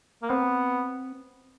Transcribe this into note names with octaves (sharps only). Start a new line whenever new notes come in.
A#3
B3 C4